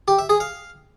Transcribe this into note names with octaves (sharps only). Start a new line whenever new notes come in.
G4
E5
G#4
F5